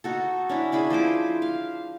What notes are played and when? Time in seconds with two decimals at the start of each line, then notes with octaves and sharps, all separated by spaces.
0.04 D#4 F#4 A4
0.49 C#4 D4 E4
0.72 D4 E4 G#4 B5
0.90 F3 E4 C5 D6
1.42 F5